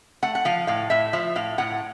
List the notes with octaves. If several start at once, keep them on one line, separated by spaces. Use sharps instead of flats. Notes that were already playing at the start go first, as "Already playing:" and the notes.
A3 F#5
F#5
F3 F5
A2 F5
A2 E5
F3 E5
A2 F5
A2 F#5